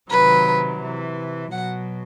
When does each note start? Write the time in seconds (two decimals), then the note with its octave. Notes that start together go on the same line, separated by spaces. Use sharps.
0.10 C3 D#3 F#3 B4
0.81 C3 E3
1.51 B2 F#3 F#5